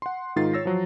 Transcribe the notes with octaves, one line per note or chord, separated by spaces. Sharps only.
F#5 C6
G#2 D#3 F4 A6 C7
C#5 E6 A#6
F3 F#3